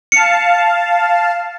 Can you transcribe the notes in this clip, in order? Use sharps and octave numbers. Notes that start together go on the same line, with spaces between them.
F5 A5 C#7